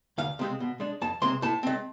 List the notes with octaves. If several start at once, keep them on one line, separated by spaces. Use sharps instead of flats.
D2 F5
C3 G#3 C4
B2
G#3 D4
F2 A5
C3 G#3 C4 C6
A2 A5
G#3 C4